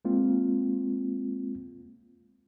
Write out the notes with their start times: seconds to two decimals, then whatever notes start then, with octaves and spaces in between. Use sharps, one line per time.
0.05 G#3 A#3 C4 F4